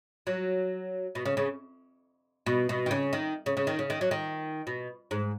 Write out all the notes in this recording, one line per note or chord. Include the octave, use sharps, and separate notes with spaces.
F#3
B2
C#3
C#3
B2
B2
D#3
C#3
D#3
C#3
C#3
D#3
C#3
D#3
F#3
D#3
B2
G#2